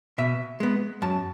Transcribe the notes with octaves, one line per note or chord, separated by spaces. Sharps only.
B2 E5
G#3 B3
F#2 A5